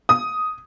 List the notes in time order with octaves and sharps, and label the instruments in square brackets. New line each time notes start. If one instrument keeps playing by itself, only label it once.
[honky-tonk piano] D#6